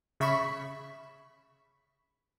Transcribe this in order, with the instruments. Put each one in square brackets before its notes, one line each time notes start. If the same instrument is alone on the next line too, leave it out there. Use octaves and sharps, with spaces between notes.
[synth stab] C#3 E5 B5 C#6 B6